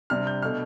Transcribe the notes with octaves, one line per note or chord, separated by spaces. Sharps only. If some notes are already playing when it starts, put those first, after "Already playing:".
C3 G3 D4 F6
G6
B2 A3 D4 F6